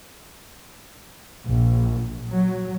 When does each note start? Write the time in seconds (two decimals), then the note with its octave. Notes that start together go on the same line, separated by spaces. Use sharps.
1.47 A#1
2.31 F#3